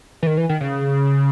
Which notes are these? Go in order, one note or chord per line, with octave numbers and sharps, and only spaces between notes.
E3
D#3
E3
D#3
C#3